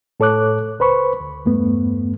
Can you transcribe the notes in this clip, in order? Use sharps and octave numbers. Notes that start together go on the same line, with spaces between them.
A2 A4 C#5 D6 F#6
C#2 B4 C5 B5 C#6
D2
E2 G2 A3 B3